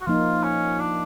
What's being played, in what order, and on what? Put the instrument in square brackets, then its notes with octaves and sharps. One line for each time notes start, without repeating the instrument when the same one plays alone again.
[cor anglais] F#4
[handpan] F3 A#3 D#4 [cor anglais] F4
[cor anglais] C#4
D4